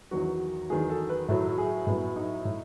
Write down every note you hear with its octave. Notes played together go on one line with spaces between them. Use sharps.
E2 D#3 F#3 F#4
E2 D#3 F#3 G#4
A4
B4
A2 F#3 A4
G#4
A2 F#3 B3
D#4
A2